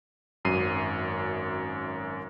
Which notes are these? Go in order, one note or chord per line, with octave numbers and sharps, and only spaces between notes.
G#1 F#2 C7 D#7